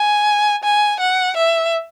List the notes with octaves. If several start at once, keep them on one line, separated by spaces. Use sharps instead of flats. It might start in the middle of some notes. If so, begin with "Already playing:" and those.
Already playing: G#5
G#5
F#5
E5